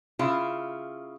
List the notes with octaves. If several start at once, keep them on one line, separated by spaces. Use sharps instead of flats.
C#3 E4 F4